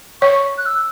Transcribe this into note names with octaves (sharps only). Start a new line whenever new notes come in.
C#5 C#6
F#6
E6